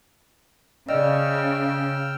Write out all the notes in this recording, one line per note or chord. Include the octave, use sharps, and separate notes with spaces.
C#3 D5 D#5 G5 E6 F6